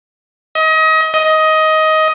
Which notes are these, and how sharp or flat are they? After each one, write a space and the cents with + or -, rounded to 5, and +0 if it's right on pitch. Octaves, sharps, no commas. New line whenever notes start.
D#5 +30
D#5 +15